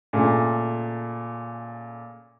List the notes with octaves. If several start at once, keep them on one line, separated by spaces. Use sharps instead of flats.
A#2 C#3 A3